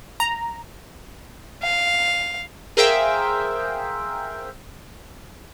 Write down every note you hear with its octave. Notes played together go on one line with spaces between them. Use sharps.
A#5
F5
G#4 A#4 C5 E5 F5 G5